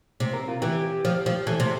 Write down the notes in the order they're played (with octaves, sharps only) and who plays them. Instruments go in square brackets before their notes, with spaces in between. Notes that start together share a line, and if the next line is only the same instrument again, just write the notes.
[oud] C3
[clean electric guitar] A#4
F4
[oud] E3 [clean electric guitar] G4
[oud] F3
F3
[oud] E3 [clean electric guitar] A4
[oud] C3